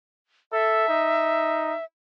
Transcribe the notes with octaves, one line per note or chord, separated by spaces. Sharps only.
A4 E5
D#4